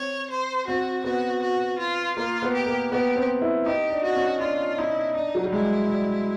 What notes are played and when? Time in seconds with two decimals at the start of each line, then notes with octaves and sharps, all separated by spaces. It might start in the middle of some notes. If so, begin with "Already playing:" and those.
Already playing: C4 C#5
0.30 C5
0.67 C4 F#4
1.04 B3 F#4
1.42 F#4
1.79 F4
2.17 A#3 F4
2.42 B3
2.53 G4
2.66 A#3
2.91 B3 G4
3.16 C4
3.42 E4
3.66 D#4 G4
3.90 D4
4.03 F#4
4.16 C#4
4.40 D4 F4
4.78 D#4 E4
5.15 D4 D#4
5.35 F#3
5.44 G3
5.52 G#3 E4
5.90 G3